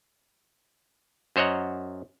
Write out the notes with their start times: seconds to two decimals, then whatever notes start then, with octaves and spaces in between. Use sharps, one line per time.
1.36 F#2 C5 C#5 D#5 F#5 A#5